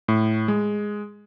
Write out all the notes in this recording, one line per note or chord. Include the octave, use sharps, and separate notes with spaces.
A2
G#3